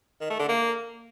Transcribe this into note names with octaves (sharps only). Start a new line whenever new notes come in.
D#3
A3
D3
A#3